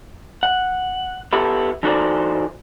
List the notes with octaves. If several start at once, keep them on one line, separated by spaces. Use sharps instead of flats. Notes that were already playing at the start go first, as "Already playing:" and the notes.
F#5
B3 E4 G4 A4
E3 D#4 F#4 A4 C5 D5